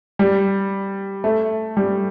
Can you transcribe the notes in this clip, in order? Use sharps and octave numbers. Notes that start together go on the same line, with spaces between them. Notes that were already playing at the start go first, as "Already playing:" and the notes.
G3
A3
G3